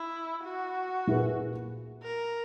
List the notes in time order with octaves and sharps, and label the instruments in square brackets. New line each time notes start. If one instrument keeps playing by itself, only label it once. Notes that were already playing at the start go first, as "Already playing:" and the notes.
Already playing: [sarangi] E4
F#4
[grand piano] A#2 A#3 E4 G#4 B4
[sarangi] A#4